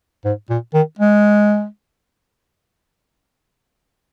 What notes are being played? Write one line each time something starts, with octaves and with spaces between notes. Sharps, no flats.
G#2
A#2
D#3
G#3